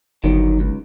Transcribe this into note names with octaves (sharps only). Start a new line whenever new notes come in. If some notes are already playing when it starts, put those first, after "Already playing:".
G1 D#3 F#3
C#2